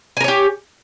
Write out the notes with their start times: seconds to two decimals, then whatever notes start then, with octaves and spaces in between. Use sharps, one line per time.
0.17 G#5
0.20 A#4
0.24 C#5
0.28 G4